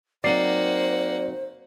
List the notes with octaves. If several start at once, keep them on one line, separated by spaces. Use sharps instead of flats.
F#3 A#3 C4 D#4 C5 D5 F#5 C7